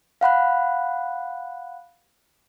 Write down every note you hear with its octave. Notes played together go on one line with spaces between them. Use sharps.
F5 F#5 B5 F#6